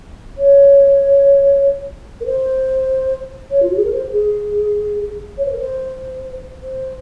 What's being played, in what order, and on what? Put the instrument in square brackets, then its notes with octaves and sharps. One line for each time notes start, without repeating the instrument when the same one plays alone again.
[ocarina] C#5
A#4
C5
C#5
F4
F#4
G#4
A#4
C5
G#4
C#5
C5
A#4
C5
C5